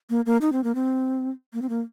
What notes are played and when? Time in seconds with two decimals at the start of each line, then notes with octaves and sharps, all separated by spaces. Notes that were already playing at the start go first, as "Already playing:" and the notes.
0.10 A#3
0.26 A#3
0.41 D#4
0.52 C4
0.64 A#3
0.75 C4
1.53 A#3
1.62 C4
1.69 A#3